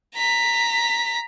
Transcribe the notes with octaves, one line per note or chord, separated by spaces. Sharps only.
A#5 B6